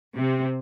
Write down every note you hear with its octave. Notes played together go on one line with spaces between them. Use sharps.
C3 C4